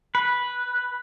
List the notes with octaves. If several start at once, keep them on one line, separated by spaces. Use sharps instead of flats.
B4